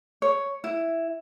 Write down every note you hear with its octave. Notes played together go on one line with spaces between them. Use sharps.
C#5
E4